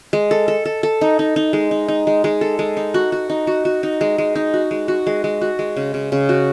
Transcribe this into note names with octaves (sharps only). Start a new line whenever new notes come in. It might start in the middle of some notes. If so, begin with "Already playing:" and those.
G#3
A4
A4
A4
A4
D#4
D#4
D#4
G#3
D#4
D#4
G#3
G#3
A4
G#3
D#4
F#4
F#4
D#4
F#4
F#4
D#4
G#3
G#3
D#4
F#4
G#3
F#4
G#3
G#3
F#4
G#3
C#3
C#3
C#3
F#4